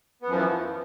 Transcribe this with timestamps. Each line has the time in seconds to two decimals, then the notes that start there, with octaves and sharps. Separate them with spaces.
0.22 B3
0.26 F#2
0.31 F3
0.35 E3